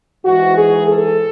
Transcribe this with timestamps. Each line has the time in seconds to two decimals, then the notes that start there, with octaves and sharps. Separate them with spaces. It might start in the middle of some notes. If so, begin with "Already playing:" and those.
0.25 G#2 E3 G#3 F#4
0.55 G#4
0.85 A4